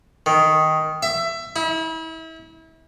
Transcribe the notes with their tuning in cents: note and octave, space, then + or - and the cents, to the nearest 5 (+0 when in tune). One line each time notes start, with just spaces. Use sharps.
D#3 +5
E5 +20
E4 -35